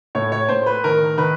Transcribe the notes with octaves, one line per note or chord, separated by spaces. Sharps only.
A2 C#5
C#5
A2 C5
B4
D#3 A#4
D#3 B4